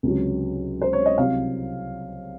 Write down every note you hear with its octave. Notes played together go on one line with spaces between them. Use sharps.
C#2 C3 F#3
C5
C#5
D#5
C2 C3 F#3 F5